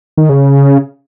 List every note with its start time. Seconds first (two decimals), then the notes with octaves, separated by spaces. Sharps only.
0.18 D#3
0.29 C#3